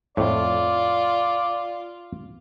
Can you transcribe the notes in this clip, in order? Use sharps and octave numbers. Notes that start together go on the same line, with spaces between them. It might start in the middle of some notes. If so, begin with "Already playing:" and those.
F2 A2 F4 D5